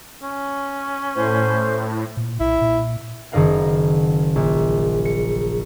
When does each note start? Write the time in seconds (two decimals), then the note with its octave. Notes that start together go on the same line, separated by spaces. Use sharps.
0.23 C#4
1.15 A2 C5
2.17 A#2
2.40 B1 E4
2.62 A#2
3.32 F#1 D#3 D#4 A#4 F5 F#5
4.36 A#1
5.05 C#7